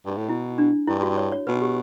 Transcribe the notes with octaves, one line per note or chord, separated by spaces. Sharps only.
G2
A2
B2 E4
D4
G2 E4
F#4
C#5
C#5
B2 B4
G4